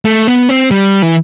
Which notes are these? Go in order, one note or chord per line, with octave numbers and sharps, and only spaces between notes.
A3
B3
C4
G3
E3